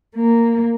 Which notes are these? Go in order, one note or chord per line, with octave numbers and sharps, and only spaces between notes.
A#3